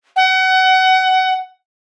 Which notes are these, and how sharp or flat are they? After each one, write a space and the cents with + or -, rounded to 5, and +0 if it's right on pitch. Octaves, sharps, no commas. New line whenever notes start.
F#5 +25